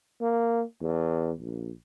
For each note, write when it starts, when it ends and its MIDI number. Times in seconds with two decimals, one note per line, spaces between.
0.20 0.63 58
0.81 1.32 40
1.40 1.71 34